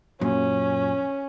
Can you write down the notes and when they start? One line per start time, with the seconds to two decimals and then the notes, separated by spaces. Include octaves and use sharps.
0.21 F#2 A#2 C#4